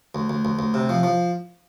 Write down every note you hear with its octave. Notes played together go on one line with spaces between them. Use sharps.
D2
D2
D2
D2
C3
F3
F3